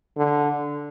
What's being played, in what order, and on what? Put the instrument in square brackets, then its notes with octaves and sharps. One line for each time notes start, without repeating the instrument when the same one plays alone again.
[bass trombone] D3